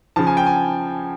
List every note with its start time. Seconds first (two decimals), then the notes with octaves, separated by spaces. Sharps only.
0.16 C#3 F3 A5
0.27 G#5
0.37 G5
0.47 G#5